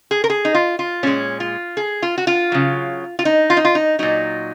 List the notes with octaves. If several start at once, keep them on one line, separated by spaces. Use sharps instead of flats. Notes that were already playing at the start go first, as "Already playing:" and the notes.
G#4
A#4
G#4
D#4
F4
F4
A#2 G#3 C#4
F4
G#4
F4
F#4
F4
C#3 F#3
F4
D#4
F4
D#4
F4
D#4
A#2 F#3 D#4